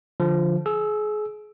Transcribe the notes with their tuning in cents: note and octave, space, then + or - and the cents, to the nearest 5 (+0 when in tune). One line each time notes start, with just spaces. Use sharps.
D3 +0 F3 +0
G#4 +30 E6 +0